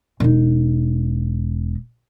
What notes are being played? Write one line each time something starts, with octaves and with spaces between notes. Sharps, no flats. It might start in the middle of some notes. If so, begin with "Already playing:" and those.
E1 D#4